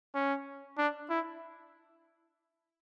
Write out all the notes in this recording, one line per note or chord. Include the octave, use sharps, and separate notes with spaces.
C#4
D4
E4